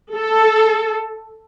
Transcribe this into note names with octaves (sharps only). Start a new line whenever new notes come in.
A4